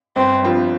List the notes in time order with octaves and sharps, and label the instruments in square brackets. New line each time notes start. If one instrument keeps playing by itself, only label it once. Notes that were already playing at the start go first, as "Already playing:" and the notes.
[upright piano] G1 [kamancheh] C4
[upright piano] G2 F3 C4 F4